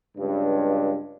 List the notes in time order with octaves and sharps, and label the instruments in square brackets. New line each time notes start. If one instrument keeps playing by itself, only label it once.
[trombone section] C#2 G2